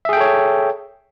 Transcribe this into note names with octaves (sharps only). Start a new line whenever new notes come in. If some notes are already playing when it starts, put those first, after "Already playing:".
G#4 A4 C#5 E5 G5